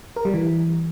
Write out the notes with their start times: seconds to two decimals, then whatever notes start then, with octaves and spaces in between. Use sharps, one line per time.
0.16 A#4
0.25 G3
0.34 E3